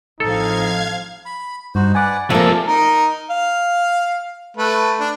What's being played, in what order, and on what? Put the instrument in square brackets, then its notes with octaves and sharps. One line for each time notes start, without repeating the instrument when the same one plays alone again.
[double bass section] A1 F3 C4 [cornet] D#4 [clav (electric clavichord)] A4 [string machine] F5 G#6
[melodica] B5
[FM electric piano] G2 [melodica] D#4 F#4 C5
[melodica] B4 D5 F#5 [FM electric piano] G#5 D6
[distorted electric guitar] C3 A4 [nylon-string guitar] F3 A#3 [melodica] D5 F5
[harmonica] D#4 A#4
F5
A3 B4
D4